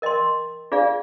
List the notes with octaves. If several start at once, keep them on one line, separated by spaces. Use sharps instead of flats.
A#4 D#5 G5 C6
D4 F4 G#4 D5 F5